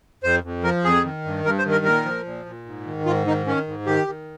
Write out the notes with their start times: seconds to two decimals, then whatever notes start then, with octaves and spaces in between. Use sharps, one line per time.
0.23 F2 C5
0.43 F2
0.64 F3 A#4
0.84 F2 G#4
1.04 D#3
1.25 G2
1.45 G2 A#4
1.59 C5
1.65 D#3
1.72 A#4
1.85 A#2 A#4
2.05 F3
2.25 A#2
2.46 A#2
2.66 G#2
2.86 D#3
3.06 G#2 F4
3.27 D#3 D#4
3.46 D#3 C#4
3.67 G#2
3.86 D#3 G4
4.07 D#3